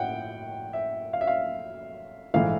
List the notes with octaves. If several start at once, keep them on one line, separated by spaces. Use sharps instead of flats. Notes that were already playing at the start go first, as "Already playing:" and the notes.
Already playing: A2 F#5 G5
E5
F5
E5
F5
A#1 G#2 E3 A3 F5